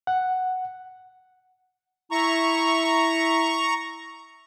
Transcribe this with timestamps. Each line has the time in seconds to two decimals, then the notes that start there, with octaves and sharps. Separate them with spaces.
0.07 F#5
2.11 E4 E5 A#5 C#6